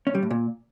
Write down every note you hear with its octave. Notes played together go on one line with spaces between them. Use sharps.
C#4
G3
A2
A#2